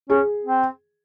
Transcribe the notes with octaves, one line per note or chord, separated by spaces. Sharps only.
C#4 G#4
C4